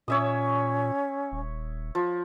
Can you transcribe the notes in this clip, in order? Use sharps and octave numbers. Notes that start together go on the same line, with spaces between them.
A#2 C#4 C#5 E5 D#6
D#1
F3